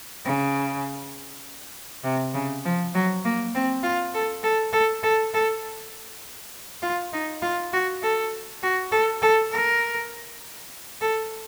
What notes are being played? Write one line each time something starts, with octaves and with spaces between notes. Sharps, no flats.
C#3
C3
C#3
F3
F#3
A#3
C4
F4
A4
A4
A4
A4
A4
F4
D#4
F4
F#4
A4
F#4
A4
A4
A#4
A4